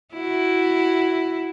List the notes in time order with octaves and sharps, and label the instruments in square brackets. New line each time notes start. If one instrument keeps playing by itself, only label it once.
[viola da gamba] E4 F#4